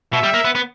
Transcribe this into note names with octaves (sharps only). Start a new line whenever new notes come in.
B2 E5
G3
A#3
B3
B3